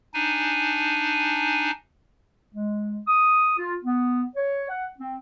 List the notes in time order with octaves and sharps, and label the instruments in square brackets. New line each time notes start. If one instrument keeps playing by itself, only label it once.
[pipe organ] D4 D#4 G#5
[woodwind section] G#3
D#6
F4
B3
C#5
F#5
C4